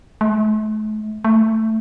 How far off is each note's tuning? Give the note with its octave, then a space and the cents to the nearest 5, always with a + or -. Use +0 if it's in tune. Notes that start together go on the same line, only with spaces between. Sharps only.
A3 -40
A3 +10